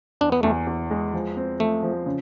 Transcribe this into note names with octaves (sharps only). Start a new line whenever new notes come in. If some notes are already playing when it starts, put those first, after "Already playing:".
E2 D4
B3
E2 A3
E2
G#3
F3
C4
F3 A3
F3
C#3